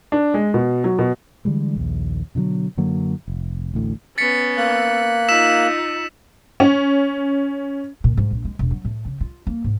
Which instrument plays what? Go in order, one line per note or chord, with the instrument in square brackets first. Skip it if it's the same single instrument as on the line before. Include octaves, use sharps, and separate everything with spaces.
[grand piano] D4
G#3
B2
F#3
B2
[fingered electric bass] D3 E3 G3 G#3
A#1 D#2
B2 D3 F3 F#3
F#2 D3 F#3 A#3
F1
A1 D2 A2
[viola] B3 C#4 [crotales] A6 B6 C#7
[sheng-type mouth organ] A#3 F#6
[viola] D#4 F4 [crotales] E6 B6 E7
[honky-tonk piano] C#4
[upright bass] A#2
G#2
A#1
G#3
E1
F#3
A2
C#3
F4
A#3
G#2